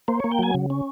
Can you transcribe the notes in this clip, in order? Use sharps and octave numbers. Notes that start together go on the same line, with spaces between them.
A#3 C5
A#3 C#5
G5
F#3 G#5
C#3
C#4